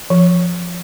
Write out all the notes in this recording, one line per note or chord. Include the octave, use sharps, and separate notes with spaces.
F3